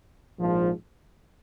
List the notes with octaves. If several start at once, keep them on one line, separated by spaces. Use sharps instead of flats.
A#1 G#2 F3